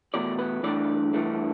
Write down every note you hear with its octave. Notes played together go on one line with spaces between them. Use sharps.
E2 B2 A3 D5
B4
G2 E3 A3 D4 D5
G2 E3 A3 D4